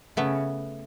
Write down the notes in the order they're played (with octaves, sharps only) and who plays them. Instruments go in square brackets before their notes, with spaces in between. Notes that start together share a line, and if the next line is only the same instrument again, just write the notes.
[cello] C#3 [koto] A3 B3